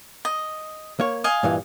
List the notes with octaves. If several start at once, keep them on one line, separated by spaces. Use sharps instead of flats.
D#5
A#3 C#5
D#5 F5 G#5
G2 A#2 E3